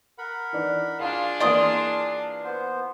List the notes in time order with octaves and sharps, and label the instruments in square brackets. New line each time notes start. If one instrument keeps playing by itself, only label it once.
[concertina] A#4 F#5 B5
[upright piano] E3 D4 D#4
[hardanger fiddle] D4 F4 [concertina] G#4 A5 [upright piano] F5
[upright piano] E3 A#3 [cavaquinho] D5 C6 D#6
[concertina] B3 C5